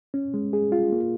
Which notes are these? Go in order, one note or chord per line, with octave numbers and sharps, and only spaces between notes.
C#4
G#3
G#4
F4
A#3